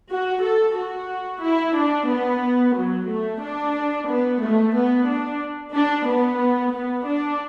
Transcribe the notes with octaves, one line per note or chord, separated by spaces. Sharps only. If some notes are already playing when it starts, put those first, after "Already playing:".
F#4
A4
F#4
E4
D4
B3
F#3
A3
D4
B3
A3
B3
D4
D4
B3
B3
D4